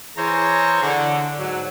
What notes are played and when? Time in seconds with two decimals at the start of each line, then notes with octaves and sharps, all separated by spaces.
0.16 E3 G#4 C5 C#5 A#5
0.83 D3
1.39 G#2 F#3